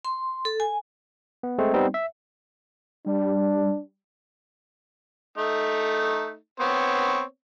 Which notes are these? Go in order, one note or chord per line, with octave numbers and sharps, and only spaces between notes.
C6
A4
G#5
B3
G#3 A3 C4
G3 B3 C4 D#4
E5
G3 D4
A3 D#4
B3 C4 C#5